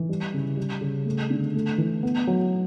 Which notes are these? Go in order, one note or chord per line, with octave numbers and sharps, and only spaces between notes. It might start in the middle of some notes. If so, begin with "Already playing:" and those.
Already playing: E3
G3
C#3
G3
C#3
A3
D3
A3
E3
B3
F#3